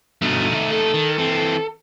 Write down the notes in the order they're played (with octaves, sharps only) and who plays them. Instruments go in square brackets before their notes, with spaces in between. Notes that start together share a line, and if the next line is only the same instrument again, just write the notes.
[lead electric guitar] G2 B2 [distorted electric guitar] A3 D#4
[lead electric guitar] D#3 E5
A4
[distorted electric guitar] D#3
E3 C4